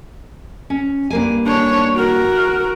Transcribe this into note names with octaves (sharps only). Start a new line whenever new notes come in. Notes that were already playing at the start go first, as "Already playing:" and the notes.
C#4
G2 A#3 G#5
D4 C#5
F#4 A#4